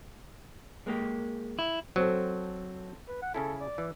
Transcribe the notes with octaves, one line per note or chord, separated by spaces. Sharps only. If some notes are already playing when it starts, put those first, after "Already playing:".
G#3 A#3 G4
E4
F#3 C4 A4
B4
F#5
C#3 C#4 E4 A4
D5
E3